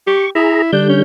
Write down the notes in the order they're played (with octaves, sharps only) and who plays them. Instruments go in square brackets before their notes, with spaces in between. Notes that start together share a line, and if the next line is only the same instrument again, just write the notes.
[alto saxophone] G4 [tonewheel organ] C#6
[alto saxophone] E4 [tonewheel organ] G#4 A#5
[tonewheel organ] D3 G3 G6 [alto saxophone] D4
[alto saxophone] C#4